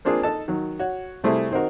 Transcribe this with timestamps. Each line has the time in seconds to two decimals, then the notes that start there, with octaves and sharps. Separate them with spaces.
0.05 A#3 C4 D4 F4 G#4 A#4
0.23 D#4 A4 D#5 A5
0.48 D#3 F#3
0.80 F#4 C#5
1.24 C3 G3 A3 C4 E4 G#4
1.51 D#3 C4 D#4 F#4 A#4